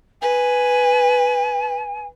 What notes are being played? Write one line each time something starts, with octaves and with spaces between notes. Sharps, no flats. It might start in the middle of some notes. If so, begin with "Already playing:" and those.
B4 G#5